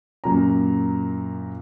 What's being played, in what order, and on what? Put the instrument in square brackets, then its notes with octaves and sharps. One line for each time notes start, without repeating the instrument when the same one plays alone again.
[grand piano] F#2 A#2 A#5